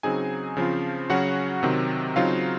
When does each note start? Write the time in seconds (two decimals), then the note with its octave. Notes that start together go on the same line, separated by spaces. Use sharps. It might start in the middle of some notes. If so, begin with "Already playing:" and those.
0.03 C#3 F#3 C4 D#4 G#4 G#5
0.57 C#3 F3 C4 F4
1.10 C#3 F#3 C#4 F#4 F#5
1.63 C3 D#3 F#3 C4
2.16 C#3 F#3 C4 D#4 F4 F5